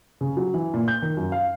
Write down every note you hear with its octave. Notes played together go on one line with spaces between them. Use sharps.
C#3
F#3
E3
A#2
G6
D#3
F#2
F5